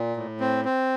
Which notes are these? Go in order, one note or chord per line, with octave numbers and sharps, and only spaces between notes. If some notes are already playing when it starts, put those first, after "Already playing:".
Already playing: A#2
A2
C4
C4